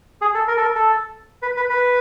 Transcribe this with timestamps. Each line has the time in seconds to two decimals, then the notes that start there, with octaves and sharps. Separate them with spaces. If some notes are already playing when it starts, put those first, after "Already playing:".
0.21 G#4
0.35 A4
0.48 A#4
0.57 A4
0.62 A#4
0.75 A4
1.42 B4
1.57 B4
1.70 B4